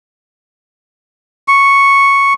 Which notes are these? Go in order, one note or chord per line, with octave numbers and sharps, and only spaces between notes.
C#6